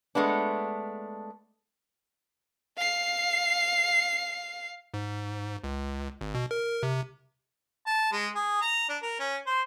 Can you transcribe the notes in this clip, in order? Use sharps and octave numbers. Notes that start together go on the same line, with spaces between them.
G#3 A3 B3 D4
F5 C7
G#2
C#2
G#1
B2
A#4
C3
A5
G#3
G#4
A#5
D4
A#4
C#4
C5